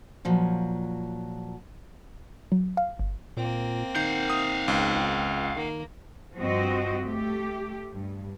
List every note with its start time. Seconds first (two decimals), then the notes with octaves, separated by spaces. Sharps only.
0.25 A#2 F3 F#3
2.52 F#3
2.77 F5
2.99 G1
3.37 A#2 A#3 C4
3.95 D#3 F5 F#5 G6
4.30 D#6
4.68 C#2
5.56 D#3 A#3
6.37 G2 F3 C4 F#4 D#5
7.03 A3 G4
7.91 G2